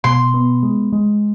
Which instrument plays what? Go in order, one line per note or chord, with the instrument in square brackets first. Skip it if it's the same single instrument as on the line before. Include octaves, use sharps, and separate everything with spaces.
[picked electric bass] B2 [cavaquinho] C6
[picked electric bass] B3
G#3
G#3